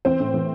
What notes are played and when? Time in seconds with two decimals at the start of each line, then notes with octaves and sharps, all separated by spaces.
0.05 E3 C4 C5
0.20 A2
0.34 E3